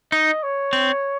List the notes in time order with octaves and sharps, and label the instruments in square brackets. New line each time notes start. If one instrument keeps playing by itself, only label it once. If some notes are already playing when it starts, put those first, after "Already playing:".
[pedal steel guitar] D#4 [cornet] D#5
[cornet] C#5
[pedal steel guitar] C4